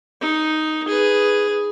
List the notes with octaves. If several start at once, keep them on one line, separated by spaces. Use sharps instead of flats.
D#4
G#4 B4